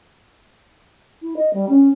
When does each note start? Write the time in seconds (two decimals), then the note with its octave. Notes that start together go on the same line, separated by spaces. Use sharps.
1.22 E4
1.36 D#5
1.53 G3
1.69 C#4